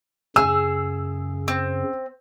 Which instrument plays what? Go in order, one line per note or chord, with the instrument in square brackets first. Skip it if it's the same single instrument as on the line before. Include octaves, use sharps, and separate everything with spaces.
[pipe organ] F#2 C#3 [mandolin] G#4 [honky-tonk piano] E6
[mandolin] C4